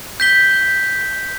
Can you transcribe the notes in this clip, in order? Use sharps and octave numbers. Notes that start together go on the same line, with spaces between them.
G6 B6 G7